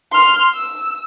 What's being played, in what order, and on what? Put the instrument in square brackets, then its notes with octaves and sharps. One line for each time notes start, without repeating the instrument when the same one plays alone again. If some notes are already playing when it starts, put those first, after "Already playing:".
[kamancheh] C6 F6
E6